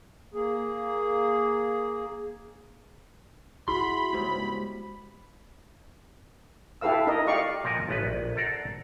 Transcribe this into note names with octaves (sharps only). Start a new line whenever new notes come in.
A#3 G#4
E4 F#4 G#4 B5 C6
C#2 G#2 G4 C5
E4 G4 A4 B4 F5 E6
D#4 A#4 D#5
G4 D5 F5 C#6
A#2 F3 A#4 F#5 G#5 A#5
A1 B3 B4
A#1
A4 C5 D5 F#5 A#5